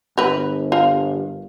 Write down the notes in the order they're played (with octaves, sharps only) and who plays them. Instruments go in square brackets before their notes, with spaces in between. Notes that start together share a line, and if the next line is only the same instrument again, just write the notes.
[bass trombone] G1 [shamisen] A#4 B4
[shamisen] F4 A#4